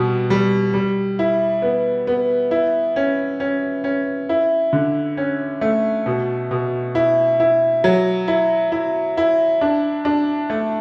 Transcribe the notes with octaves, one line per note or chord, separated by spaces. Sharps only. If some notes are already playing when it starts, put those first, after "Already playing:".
Already playing: B2 G3
G3
G3
E4
B3
B3
E4
C#4
C#4
C#4
E4
D3
C#4
A3
B2
B2
E4
E4
F#3
E4
E4
E4
D4
D4
A3